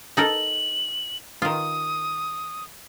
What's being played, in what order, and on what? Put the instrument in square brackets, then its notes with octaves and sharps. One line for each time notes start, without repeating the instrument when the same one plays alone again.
[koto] D#4 A4 A#4 [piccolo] F#7
[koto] D#3 F4 [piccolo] D#6